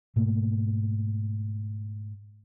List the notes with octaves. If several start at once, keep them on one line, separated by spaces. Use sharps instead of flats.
G#2 B2 A3 A#3